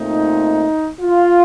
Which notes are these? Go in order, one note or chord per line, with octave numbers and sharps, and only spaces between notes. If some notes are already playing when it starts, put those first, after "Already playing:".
Already playing: A#2 A3 C4 D#4
F4